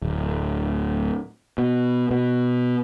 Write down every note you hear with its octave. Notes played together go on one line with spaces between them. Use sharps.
D1
B2
B2